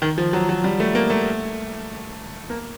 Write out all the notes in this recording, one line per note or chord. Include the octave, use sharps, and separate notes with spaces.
D#3
F3
F#3
F#3
G3
A3
A#3
A3
A#3